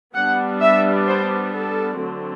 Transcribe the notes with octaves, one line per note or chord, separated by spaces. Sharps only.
G3 B3 D4 F#5
E5
C5
A4
D3 F#3 A3 C4